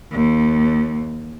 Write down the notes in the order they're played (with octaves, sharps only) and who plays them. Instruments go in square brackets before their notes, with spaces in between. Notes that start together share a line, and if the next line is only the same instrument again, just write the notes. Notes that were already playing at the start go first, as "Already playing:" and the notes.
[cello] D#2